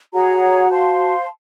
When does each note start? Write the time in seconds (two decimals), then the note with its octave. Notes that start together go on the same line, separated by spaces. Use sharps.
0.13 F#4 G#4 C#5 F#5 A#5
0.70 C5 F5 A5 C6